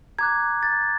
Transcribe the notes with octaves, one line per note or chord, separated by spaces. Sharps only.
A#5 D6 F#6 G#6
A6